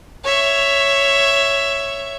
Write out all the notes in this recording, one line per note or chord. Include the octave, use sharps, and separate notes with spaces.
C#5 E5